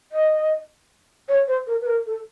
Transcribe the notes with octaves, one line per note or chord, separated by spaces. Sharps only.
D#5
C#5
C5
A#4
B4
A#4
A4